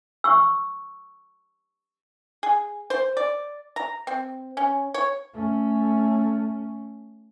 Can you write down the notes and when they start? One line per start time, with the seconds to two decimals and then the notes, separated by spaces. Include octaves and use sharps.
0.24 C#6 E6
2.43 G#4
2.90 C5
3.17 D5
3.76 A#5
4.07 C4
4.57 C#4
4.94 C#5
5.34 A3 C#4